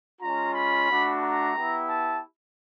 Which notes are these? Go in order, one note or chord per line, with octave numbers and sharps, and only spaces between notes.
G#3 C#4 F4 A#5
B5
A3 D4 F#4
A#5
B3 E4 G4
A5